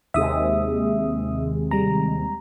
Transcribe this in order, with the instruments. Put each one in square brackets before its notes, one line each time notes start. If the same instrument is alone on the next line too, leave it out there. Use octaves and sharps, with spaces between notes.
[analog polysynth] D#2 C3 G#3 [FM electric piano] E5 D#6
[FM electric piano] G3 A#5